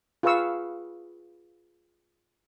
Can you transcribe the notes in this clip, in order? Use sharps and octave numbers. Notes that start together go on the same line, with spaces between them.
F4 G#4 B4 F5 C#6 E6